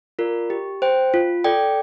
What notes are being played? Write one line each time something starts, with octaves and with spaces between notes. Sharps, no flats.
F4 A#4 D5
G4
C5 G5
F4
A4 D5 G5